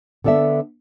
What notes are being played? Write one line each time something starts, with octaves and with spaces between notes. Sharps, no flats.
D3 B3 A4 D5 E5